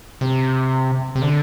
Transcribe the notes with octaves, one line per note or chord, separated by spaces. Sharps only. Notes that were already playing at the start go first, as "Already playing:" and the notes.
C3
C3
D3